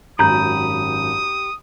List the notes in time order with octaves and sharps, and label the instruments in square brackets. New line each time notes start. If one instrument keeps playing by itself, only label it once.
[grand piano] G#1 F#2 [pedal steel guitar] G4 B5 G6 [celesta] A#5 [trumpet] D#6